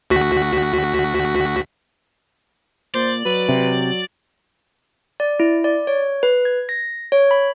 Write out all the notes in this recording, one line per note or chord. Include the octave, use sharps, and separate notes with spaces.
D2 F#4 B6
A#2 C5 D5
F#3 B4
C3
D5
E4
D5
C#5
B4
G#6
A#6
C#5
B5